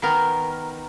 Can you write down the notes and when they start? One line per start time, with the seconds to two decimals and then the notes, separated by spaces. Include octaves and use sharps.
0.02 D#3 B3 A#4